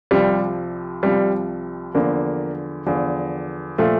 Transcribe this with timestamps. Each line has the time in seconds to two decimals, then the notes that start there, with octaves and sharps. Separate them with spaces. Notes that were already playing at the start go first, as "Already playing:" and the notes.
0.11 C2 C3 F3 G3
1.03 C2 C3 F3 G3
1.95 E2 D3 F3 A#3
2.86 E2 D3 F3
3.78 A#2 F3 A3